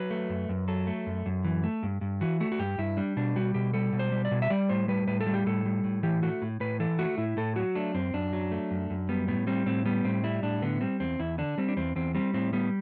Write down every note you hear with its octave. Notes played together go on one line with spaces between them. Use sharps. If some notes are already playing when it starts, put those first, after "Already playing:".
Already playing: F#3 B4
A3
F#2
F#2
F#3 A4
A3
F#2
F#2
E3
A3
G2
G2
E3 F#4
A3 F#4
F#4
G2 G4
G2 E4
G3 D4
B2 D4
G3 F#4
B2 G4
G3 A4
B2
C5
G3
D5
B2
E5
G3 D5
A2 C5
G3 B4
A2 B4
A4
G3
G4
A2 A4
G3
A2
E3 G4
A3 F#4
A2
A2 B4
E3 A4
A3 F#4
A2 E4
A2 A4
F#3 F#4
A3 D4
F#2 C4
F#2 D4
F#3
A3
F#2
F#2
G3 B3
A2 B3
G3 C4
A2 C4
G3 B3
A2 C4
G3 E4
A2 D4
D3 B3
G3 C4
E2 C4
E2 E4
D3 D4
G3 C4
D4
E2 C4
E2 C4
G3 C4
A2 C4
G3 B3